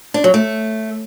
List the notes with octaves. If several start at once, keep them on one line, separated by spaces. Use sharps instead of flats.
D4
F#3
A3